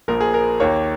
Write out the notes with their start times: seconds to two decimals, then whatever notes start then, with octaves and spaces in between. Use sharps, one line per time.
0.08 A#1 A#2 F3 A#4
0.21 G#4
0.34 A#4
0.60 D#2 D#3 A#3 C#5